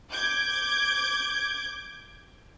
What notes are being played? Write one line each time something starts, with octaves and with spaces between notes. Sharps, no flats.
D6 G6 G#6 D7